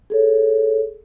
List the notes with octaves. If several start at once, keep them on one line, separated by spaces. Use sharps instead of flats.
G#4 A4 C#5